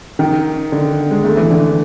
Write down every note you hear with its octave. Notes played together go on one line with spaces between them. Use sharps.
D#3
D3
G#3
A3
E3
D3